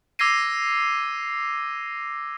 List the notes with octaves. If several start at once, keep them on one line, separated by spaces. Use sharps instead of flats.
D6 E6 G#6 A#6 C7 D#7